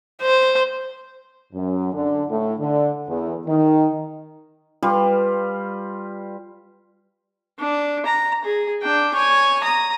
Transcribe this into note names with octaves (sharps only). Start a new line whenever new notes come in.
C5
F#2
D3
A2
D3
E2
D#3
G3 F4 B4
D4
A#5
G#4
D4 G5
C#5 G#5
A#5 D#6